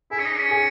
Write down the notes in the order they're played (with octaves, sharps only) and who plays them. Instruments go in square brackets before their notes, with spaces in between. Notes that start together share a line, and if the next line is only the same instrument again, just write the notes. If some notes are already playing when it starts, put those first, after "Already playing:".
[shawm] E4 [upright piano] G#4
[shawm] C#4
D#4
C#4
[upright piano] G#4